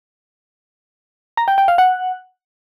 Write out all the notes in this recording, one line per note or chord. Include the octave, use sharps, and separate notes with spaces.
A#5
G5
G5
F5
F#5